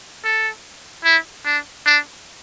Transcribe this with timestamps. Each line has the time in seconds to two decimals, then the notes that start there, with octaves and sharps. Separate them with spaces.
0.24 A4
1.04 E4
1.45 D4
1.86 D4